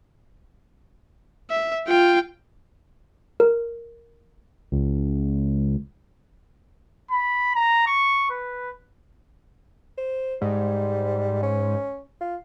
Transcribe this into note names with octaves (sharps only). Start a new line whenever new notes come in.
E5
F4 G5
A#4
C#2
B5
A#5
C#6
B4
C5
G#2 G3
C#4
F4